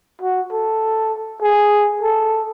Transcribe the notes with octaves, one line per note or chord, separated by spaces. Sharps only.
F#4
A4
G#4
A4